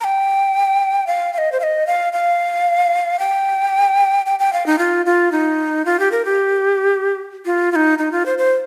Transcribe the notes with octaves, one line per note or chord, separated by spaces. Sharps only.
A#5
G5
F5
F5
D#5
C5
F5
D#5
F5
F5
G5
G5
G5
F5
D#4
F4
F4
D#4
F4
G4
A#4
G4
F4
F4
D#4
D#4
F4
C5
C5